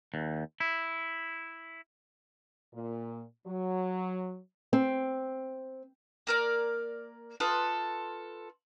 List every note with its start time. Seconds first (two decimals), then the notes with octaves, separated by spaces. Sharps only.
0.14 D#2
0.60 E4
2.74 A#2
3.46 F#3
4.73 C4
6.27 A#3 A#4 D5
7.40 F4 A4 B4 D#6